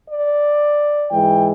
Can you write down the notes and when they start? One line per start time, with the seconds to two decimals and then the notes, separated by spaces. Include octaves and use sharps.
0.08 D5
1.11 G#2 E3 G#3 G5